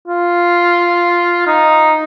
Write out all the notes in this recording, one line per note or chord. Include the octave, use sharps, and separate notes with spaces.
F4
D#4